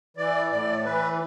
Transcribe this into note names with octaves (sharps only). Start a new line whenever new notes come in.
E3 D5
A2 D5
E3 B4